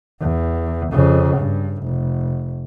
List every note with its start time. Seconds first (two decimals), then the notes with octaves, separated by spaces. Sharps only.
0.20 E2
0.92 F2 C#3
1.37 G2
1.83 F1